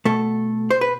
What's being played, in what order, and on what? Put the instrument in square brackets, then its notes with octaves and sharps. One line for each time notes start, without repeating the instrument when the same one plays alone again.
[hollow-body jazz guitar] B2 A3 A4
C5
B4